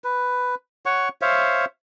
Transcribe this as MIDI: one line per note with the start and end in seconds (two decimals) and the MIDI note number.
0.04 0.55 71
0.86 1.09 73
0.86 1.09 78
0.86 1.09 85
1.22 1.65 72
1.22 1.65 73
1.22 1.65 76
1.22 1.65 77